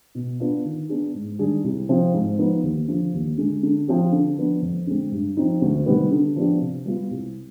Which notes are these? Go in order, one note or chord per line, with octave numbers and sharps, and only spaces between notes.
B2
B3 D4 F4
D#3
B3 D4 G#4
G#2
D#3 G3 D4 G#4
C2
C3 F3 C4 F4
G#2
F3 B3 D#4
D#2
D3 F3
D#2
D3 G#3
D3
F3 C4 G4
D3
F3 B3 D4
F2
D3 G#3 C4
G2
F3 C4 D#4
D2
C3 D#3 G3 B3
D3
F3 B3 D4 G4
C3
G3 B3 F4
C2